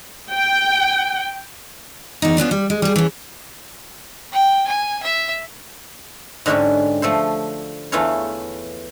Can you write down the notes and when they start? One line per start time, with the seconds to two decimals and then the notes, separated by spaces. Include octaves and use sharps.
0.34 G5
2.22 E2 D#4
2.37 B3 C#4 D4 F4
2.51 G3
2.70 G#3
2.82 G3 G#4
2.96 E3 C#4
4.32 G5
4.67 G#5
5.03 E5
6.46 G#2 D3 G#3 C#4 F#4 G4
7.02 F3 A3 A4 C5
7.92 E2 E3 A3 F4 A4 C#5